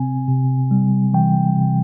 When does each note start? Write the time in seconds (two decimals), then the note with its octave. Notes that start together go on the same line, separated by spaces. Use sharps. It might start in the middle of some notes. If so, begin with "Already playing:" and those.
Already playing: C3 C4 G#5
0.28 C3
0.71 G3
1.14 E3 G5
1.57 C3